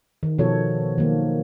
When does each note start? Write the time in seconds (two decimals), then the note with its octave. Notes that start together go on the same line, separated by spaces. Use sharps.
0.23 D#3
0.38 B2 F3 A4 C#5
0.98 D#3 F#3 A#3